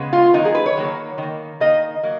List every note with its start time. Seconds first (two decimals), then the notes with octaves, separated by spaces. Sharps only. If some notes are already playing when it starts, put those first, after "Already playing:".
Already playing: C#3 G#3 B3
0.13 F4
0.33 D#3 F#3 A#3 D#4
0.45 G#4
0.55 B4
0.66 C#5
0.77 D#3 F#3 A#3
1.18 D#3 A#3
1.60 D#3 A#3 D#5
2.03 F#3 A#3